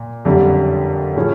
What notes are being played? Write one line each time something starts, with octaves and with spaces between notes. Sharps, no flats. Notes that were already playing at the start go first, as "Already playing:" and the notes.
Already playing: A#2
F#1 F2 D3 G3
A2 F3 G#3 C#4